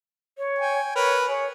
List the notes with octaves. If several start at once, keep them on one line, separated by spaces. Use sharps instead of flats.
C#5
G5 G#5
A#4 B4 C#5
G#4 C#5